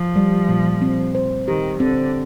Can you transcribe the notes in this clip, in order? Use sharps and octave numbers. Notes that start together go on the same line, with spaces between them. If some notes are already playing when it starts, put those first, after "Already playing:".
Already playing: F3
G3
A#2
C4
C5
D#3 G4
D3 C4